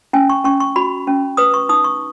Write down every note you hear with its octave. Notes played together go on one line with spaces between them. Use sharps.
C#4 G#5
C#6
C#4 C#6
C#6
F#4 B5
C#4
B4 D#6
C#6
D#4 D#6
C#6